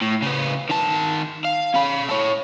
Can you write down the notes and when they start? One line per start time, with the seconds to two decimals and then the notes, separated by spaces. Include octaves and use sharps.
0.02 A2
0.22 C#3 B3
0.69 D#3 A5
1.45 F5
1.74 C#4 B5
2.09 A4 C#5